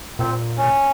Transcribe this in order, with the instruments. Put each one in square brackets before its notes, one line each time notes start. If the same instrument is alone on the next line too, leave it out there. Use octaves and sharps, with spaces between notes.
[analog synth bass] A#2 [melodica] C4
[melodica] C#4